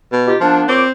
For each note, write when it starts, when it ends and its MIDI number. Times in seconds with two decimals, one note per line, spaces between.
0.12 0.32 47
0.26 0.36 63
0.26 0.36 65
0.26 0.36 67
0.40 0.62 53
0.40 0.67 58
0.40 0.67 59
0.40 0.67 62
0.68 0.83 46
0.68 0.90 60
0.68 0.83 73
0.68 0.83 86